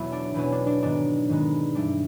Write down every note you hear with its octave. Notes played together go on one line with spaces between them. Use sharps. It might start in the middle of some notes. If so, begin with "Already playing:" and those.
Already playing: E2 B2 F#3 B3 E4
D4
E2 B2 F#3 B3 C#4
D4
D4
G#2 D#3 G#3 B3 D4
G#2 D#3 G#3 B3
G2 E3 G3 D4